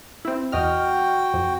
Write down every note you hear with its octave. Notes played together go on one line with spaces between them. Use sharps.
C4 E4
E2 F#4 D#5 G5 F6
F2